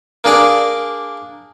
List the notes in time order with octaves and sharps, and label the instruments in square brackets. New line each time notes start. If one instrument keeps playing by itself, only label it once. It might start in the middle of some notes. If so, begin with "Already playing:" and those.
[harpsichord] A#3 D4 G#4 D5